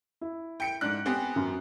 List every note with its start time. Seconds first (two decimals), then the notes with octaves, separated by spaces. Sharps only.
0.21 E4
0.60 G5 C#7 D7
0.81 G#2 D4 F#6
1.06 B3 C4 G4 G#5
1.36 F#2